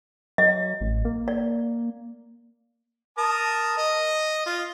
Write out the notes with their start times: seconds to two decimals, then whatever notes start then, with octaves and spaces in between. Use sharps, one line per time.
0.38 F#3 D#5
0.81 A1
1.05 A#3
1.28 D5
3.18 A#4 A5 D#6
3.78 D#5
4.46 F4